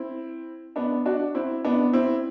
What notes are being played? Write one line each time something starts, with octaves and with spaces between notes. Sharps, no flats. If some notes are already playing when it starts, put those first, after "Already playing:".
Already playing: C4 E4
B3 D4
D4 F#4
C4 E4
B3 D4
C4 E4